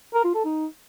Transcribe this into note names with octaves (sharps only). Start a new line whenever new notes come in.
A#4
F4
A4
D#4